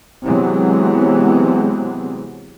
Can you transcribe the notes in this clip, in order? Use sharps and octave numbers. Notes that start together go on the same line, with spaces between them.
C3 E3 F#3 G#3 B3 C4